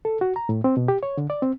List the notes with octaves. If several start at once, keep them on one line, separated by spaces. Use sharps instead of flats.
A4
F#4
A#5
A2
C4
B2
G4
C#5
D3
D5
C4